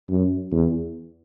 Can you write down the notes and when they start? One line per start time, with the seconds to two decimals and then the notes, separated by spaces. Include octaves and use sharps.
0.10 F#2
0.52 E2